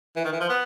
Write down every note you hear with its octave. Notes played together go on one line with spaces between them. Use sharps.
E3
D#3
E3
F3
B3